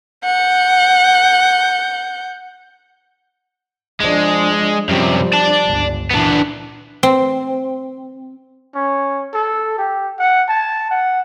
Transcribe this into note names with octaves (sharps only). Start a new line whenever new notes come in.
F#5 G6
F3 G#3 D4
F#2 C3 F3 G3
D5 A5
G1 C#2
A#2 E3 B3 D4
C4
C#4
A4
G4
F#5
A5
F#5